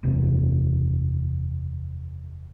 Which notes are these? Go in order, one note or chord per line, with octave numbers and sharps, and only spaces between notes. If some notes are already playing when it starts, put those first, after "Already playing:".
F#1 E2 C3